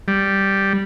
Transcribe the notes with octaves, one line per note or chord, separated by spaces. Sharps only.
G3